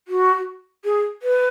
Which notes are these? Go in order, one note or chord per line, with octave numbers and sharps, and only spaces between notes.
F#4
G#4
B4